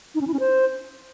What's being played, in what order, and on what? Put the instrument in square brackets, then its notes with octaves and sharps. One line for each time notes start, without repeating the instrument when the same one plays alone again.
[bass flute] D#4
C#4
E4
C#4
C5